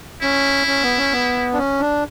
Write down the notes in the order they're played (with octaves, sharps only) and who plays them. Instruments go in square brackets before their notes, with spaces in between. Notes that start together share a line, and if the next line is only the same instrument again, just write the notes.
[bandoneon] C#4 [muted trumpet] E4
[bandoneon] C#4
B3
C#4
B3
D4
C#4
D4